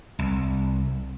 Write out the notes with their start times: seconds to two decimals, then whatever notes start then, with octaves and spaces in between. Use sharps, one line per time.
0.19 C2